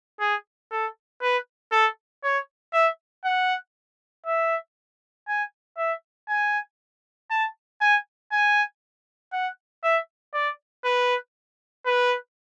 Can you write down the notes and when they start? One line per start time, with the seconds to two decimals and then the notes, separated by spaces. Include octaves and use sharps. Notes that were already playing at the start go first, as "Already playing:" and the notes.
0.20 G#4
0.71 A4
1.22 B4
1.72 A4
2.23 C#5
2.73 E5
3.25 F#5
4.26 E5
5.28 G#5
5.77 E5
6.29 G#5
7.31 A5
7.81 G#5
8.32 G#5
9.33 F#5
9.83 E5
10.34 D5
10.85 B4
11.86 B4